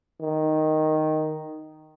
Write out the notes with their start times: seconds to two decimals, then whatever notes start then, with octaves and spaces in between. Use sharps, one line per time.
0.21 D#3